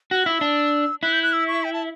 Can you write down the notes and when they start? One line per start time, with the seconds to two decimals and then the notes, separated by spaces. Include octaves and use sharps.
0.11 F#4 F#6
0.26 E4 E6
0.41 D4
1.03 E4 F#6
1.13 G6
1.23 F#6
1.33 E6
1.48 C#6
1.64 G5
1.73 A5